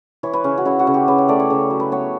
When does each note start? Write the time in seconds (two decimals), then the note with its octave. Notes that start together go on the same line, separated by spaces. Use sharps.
0.23 E3 C#5
0.33 B4
0.44 C#3 C#4
0.58 F#4
0.65 C#3 E4
0.79 F#4
0.87 C#3
0.94 G4
1.08 C#3 B4
1.18 C#5
1.28 A3 D5
1.40 C#5
1.50 C#3
1.70 F#3
1.80 B4
1.92 B3 C#5